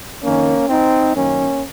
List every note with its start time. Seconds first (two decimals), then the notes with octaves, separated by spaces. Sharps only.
0.22 F2 D#3 A#3 C#4
0.68 C4 D#4
1.14 F#2 D#3 A#3 C#4